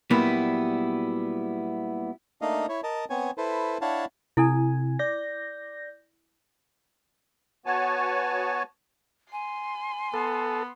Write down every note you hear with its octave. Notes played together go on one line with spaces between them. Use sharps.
A#2 F#3 G3 A#3 B3 E4
A3 A#3 D4 D#4 D#5 F5
E4 C#5
A#4 D#5 A5
B3 C4 C#5 G#5
E4 A4 B4 C5
D4 E4 C#5 F5 F#5 A5
C3 E4 A4 G#5
D5 G6 A#6
B3 F#4 C#5 G#5 A5
G#5 C6
B3 A4